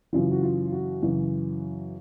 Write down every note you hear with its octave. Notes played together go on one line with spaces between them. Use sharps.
F#2 C#3 E3 F4
F#4
F4
F#4
F#2 C#3 E3